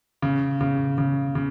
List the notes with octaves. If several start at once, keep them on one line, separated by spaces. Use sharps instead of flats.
C#3
C#3
C#3
C#3